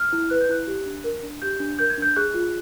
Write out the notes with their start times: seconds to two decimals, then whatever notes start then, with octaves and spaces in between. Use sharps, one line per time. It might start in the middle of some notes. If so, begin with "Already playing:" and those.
Already playing: F6
0.13 E4
0.30 B4 F#6
0.41 G6
0.49 E4 F#6
0.67 G4
0.86 D4
1.04 A#4
1.23 D4
1.42 G4 G6
1.60 D4
1.79 A#4 G6
1.90 G#6
1.98 D4 G6
2.16 G#4 F#6
2.34 F4